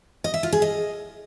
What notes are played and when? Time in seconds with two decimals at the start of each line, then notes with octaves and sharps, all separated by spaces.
0.24 D#5
0.34 E5
0.43 F4
0.53 G#4
0.62 D#5